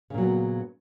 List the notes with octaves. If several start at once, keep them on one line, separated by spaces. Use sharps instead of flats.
A#2 C#3 F#3 B3